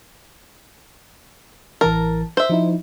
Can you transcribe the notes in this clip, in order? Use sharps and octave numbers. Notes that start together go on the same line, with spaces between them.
A1 E3 A#4 A5
C5 E5
F3 D#4 E4